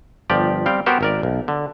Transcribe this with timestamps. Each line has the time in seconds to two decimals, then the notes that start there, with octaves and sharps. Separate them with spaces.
0.30 G1 F3 G4 D5
0.66 G3 C4 F5 G5
0.86 B3 F#4 G4 A#4 C5
1.01 G#1 A#4 D5
1.23 B1
1.48 D3